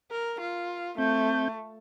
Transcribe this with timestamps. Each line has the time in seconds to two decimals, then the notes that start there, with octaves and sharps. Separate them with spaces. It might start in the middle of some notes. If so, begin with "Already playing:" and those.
0.11 A#4
0.41 F4
0.98 A3 C4 G6